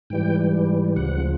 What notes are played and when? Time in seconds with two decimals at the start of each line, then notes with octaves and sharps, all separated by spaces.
0.10 G#2 E3 G3 G5
0.96 D2 C#3 F3 F#5